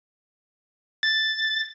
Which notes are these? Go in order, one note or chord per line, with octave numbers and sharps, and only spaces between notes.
A6